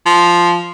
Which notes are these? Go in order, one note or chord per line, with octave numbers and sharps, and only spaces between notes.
F3